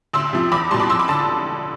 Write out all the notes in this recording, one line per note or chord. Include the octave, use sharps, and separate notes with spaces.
D2 C6 E6
C3 F3
E2 B5 D6
B2 G3 A5 C6
B5 D6
F2 C6 E6
B5 D6
D3 A5 C6